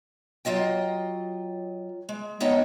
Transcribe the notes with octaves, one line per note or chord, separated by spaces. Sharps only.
F#3 F4 D#5 G5
G#3
B3 D#4 A4 C#5 D#5 G5